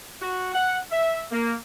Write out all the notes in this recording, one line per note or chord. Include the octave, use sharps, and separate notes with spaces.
F#4
F#5
E5
A#3